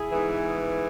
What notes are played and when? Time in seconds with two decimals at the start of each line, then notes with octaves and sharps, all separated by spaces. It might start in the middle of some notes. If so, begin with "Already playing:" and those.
Already playing: E4 G#4
0.10 G#2 E3 B3